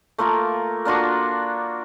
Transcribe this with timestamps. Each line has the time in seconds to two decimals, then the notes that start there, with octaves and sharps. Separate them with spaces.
0.18 A3 A#3 F4 A#4
0.85 A#3 D4 F4 F#4